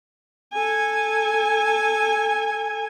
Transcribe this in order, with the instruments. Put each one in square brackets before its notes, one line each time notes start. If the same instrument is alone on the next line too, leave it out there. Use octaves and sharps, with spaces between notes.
[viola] A4 G#5